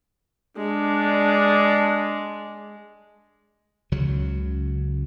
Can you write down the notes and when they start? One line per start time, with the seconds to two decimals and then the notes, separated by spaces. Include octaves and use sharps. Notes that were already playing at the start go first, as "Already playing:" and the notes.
0.57 G#3 D4
3.92 C#2 C#3 F#3